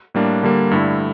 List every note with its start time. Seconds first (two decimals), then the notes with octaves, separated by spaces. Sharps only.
0.14 A2 G3 A#3 D4
0.43 D3 G3 A#3
0.71 G2 D3 A3 E4